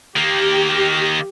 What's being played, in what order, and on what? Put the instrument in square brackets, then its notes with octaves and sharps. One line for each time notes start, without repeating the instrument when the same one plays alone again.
[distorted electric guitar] D#3 A#3 [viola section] G4